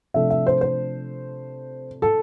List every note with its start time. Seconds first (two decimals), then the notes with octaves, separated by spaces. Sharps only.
0.14 C3 F3 A3 D4 E5
0.30 E5
0.47 C5
0.61 C5
2.02 A4